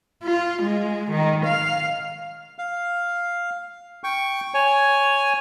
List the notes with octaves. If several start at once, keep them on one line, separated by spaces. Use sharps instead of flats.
F4
G#3
D#3
F5
F5
G5 C#6
C#5 G#5